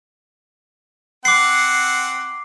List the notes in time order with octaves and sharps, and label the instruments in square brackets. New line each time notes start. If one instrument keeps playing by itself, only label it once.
[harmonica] C4 F#5 [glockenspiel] D6 C7